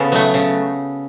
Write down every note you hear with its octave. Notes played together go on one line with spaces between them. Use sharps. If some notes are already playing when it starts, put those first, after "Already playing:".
Already playing: C#3 B3 F#4 A4
F#3 A3
C#3